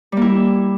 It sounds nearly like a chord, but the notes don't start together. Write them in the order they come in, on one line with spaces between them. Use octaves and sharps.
G3 A#3 E4